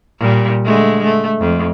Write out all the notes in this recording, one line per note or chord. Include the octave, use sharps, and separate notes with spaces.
A#2 G3
D3 G#3 A3
A3
F2